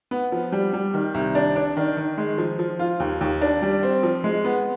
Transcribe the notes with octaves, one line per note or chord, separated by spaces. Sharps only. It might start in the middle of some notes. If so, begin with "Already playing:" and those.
B3
F3
G3
G3
D#3
C2
D4
D4
D#3
D#3
G#3
F3
F3
F4
D#2
D#2
D4
G3
C4
F3
G#3
B3